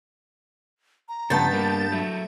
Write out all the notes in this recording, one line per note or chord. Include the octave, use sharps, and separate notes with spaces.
A#5
G2 C#3 F3 B3 A5 G6 A6
G3 A#3 G4 A#4
F#3 A3 E5